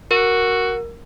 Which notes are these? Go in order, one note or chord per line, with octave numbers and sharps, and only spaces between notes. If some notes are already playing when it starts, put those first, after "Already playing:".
F#4 A#4